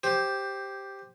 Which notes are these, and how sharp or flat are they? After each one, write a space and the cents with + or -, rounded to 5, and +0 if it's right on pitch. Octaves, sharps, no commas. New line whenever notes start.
G4 +0 C5 +5